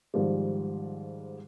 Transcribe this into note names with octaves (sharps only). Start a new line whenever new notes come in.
G#2 D#3 F3 G3